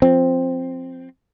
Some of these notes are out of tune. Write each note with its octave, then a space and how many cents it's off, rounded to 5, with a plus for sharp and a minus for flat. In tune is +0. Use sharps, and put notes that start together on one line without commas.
F3 +0 C4 +0